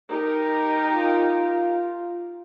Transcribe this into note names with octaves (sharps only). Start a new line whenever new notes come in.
D#4 G4 A#4
F4